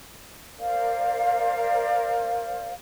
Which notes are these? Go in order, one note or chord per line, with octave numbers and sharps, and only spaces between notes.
A#4 C5 D5 F5